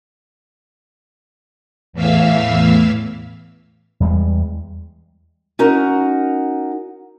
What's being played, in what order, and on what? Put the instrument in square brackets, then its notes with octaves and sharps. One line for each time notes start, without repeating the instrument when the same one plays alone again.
[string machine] E2 A2 E3 E5 F5 E6
[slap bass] E2 G3 G#3
[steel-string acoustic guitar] C#4 D#4 F#4 A#4